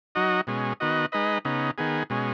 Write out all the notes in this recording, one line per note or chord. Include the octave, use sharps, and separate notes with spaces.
F#3 D#4 F#4 D#5
B2 G#3 C#4
D#3 B3 F#4 D#5
G#3 D#4 B4 D#5
C#3 B3 D#4
D#3 B3 G#4
B2 G#3 C#4